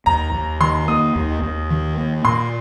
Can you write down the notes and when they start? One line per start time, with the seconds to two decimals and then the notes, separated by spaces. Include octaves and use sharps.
0.06 D#2 A#5
0.33 D#2
0.60 D#3 C6
0.88 A#3 D#6
1.16 D#2
1.42 D#2
1.70 D#3
1.97 A#3
2.25 A#2 C6